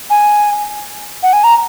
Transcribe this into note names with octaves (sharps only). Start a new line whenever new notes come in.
G#5
F#5
G#5
A#5